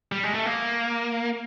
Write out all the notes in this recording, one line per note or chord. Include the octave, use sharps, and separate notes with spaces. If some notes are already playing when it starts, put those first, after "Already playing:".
G3
G#3
A3
A#3